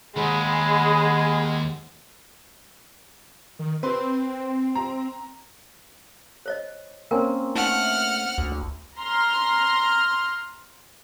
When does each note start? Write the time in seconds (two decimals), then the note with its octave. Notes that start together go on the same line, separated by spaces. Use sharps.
0.16 D#2 G#3 G#4 F#5 B5
3.59 D#3
3.83 C4 B4 C6
4.75 A#5
6.46 C5 C#5 D#5
7.11 A#3 C4 C#4 A#4 G#5
7.56 A3 D#4 F#5 C6 F6
8.38 D2
8.99 A#5 C6 F6